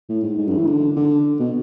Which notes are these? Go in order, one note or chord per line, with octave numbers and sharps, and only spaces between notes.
A2
G#2
G#2
F#2
E3
D3
D3
B2